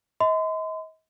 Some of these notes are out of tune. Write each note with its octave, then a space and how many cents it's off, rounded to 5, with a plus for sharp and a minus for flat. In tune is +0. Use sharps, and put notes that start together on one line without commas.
D#5 +40 C6 -40